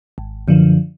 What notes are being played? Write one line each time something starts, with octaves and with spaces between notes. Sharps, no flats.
G#1
F#2 D3 F3